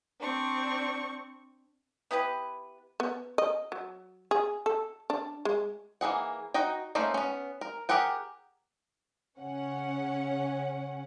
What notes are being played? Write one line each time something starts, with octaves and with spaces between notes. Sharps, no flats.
C4 D4 C#6
B3 E4 G4 B4
B3
D#5
F#3
G#4
A4
D4
G#3
E3 A#3 G#4 F#5
D#4 F#4 D#5 G5
A3 A#3 C#4 D#4 C5
B3 C#4
A#4
G4 G#4 A#4 F#5 G5
C#3 C#4 F#5